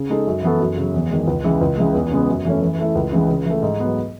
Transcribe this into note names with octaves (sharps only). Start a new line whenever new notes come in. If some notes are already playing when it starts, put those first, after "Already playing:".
Already playing: C#3
G#3 D#4 A4
F#2
E3 B3 F#4 A4
F#2
C#3 F#3
E2
D#3 G#3
C#2
C#3 E3 G#3
C#2
C#3 E3 G#3
E2
C#3 G#3 B3
F#2
E3 A3 C#4
E3
A3 E4 A4
C#2
C#3 E3 G#3
C#3
E3 A3
G#2
F#3 B3